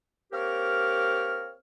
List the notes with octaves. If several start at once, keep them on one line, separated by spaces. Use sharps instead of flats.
A#3 C4 G4 A#4 C#5 F6